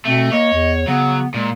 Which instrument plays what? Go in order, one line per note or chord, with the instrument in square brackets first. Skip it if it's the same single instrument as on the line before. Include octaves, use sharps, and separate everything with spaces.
[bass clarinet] B2 [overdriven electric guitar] A3 [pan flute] C4
[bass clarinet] A#3 [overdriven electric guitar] C#5 [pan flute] D#5
[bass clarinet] E2
[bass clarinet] C#3 [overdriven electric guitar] F#3 [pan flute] B3
[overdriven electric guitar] A#2 [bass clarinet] G#3